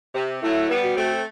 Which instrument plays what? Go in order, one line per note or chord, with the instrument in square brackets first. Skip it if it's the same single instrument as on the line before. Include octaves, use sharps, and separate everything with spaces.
[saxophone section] C3
[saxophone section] F#3 A3 [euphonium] E4
[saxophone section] G3 B3
[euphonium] F#4
[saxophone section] A3 C4